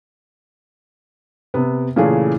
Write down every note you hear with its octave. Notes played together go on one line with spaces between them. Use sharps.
C3 B3
A#2 C#3 E3 A3 G#4